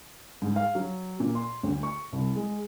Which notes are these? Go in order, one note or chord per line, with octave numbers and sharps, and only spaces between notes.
G#2
F5
F#3
A#2
C6
D2
C#6
C2
G#3